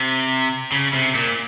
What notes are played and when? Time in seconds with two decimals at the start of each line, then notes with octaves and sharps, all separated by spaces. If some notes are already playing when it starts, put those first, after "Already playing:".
Already playing: C3
0.72 C#3
0.93 C3
1.15 A#2